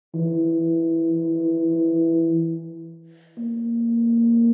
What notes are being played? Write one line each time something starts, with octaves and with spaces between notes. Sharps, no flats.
E3
A#3